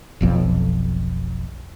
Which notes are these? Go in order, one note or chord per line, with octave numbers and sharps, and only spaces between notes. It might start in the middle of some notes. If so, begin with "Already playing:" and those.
F1 B1 F2